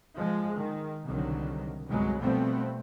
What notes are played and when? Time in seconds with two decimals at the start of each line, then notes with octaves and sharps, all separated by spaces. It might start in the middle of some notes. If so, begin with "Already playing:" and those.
0.18 F3 G#3
0.55 D#3
1.05 C2 B2 D3 D#3 F#3
1.88 G1 C2 F#3 G#3 B3
2.20 B2 F3 G3 A3 B3 C4